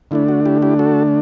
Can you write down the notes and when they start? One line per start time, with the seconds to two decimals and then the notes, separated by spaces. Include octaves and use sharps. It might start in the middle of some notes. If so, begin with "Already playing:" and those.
0.11 D3 A3 D4 E4
0.29 F#4
0.45 E4 G4
0.62 E4 G4
0.79 F#4 A4